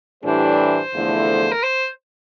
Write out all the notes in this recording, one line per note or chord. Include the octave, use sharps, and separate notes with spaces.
A2 E3 G3 D4 G4 C5
E2 D3 F3 A3 E4
A#4
C5